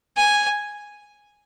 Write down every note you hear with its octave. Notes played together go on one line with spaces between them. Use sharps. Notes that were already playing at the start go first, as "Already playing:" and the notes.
G#5